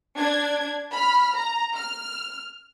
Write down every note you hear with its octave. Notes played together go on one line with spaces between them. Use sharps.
D4 G#6
B5 F6
A#5
F6